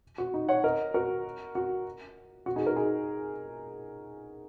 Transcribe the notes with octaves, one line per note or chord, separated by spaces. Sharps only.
F#4
D#4
C#5 F#5
A#4 D#5
F#4 A#4
F#4
F#4
D#4 G#4
F#4 A#4
D#4 G#4